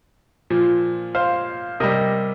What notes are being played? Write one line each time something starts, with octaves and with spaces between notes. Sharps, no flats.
A#2 F3
C5 F5
C3 G3 A#4 D#5